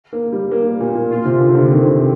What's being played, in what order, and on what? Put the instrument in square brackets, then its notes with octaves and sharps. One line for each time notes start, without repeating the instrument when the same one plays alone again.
[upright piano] A#3
G3
A#3
G3
A#2
A#2
[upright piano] A#2 [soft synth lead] F4
[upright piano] C3
D3
C3
D3
[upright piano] D#3 [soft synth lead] C4
[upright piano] C3